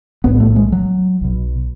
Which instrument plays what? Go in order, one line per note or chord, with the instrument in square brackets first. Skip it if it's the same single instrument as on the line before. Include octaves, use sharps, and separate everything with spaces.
[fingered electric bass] B1 A2 B3
A3
G#3
F#3
B1 B2